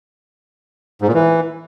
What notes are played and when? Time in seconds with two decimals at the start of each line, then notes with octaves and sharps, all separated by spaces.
1.02 G#2
1.08 A#2
1.14 E3